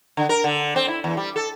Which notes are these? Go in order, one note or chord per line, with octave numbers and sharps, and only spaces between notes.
D3
A#4
D3
C4
E4
E2
G3
A4